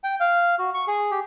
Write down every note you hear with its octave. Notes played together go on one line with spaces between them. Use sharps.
G5
F5
F#4
C#6
G#4
G4